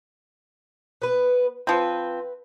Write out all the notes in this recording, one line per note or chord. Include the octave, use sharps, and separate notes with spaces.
B3 B4
F3 C4 B4